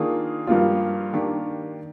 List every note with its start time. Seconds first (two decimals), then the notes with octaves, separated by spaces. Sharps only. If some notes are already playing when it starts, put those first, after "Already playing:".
Already playing: D#3 A#3 D4 F4 G#4
0.47 G2 F3 A#3 F4
1.13 D#3 A#3 D4 G4